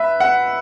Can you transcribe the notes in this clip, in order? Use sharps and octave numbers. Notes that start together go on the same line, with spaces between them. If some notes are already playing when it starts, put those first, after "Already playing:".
Already playing: B4 E5
F#5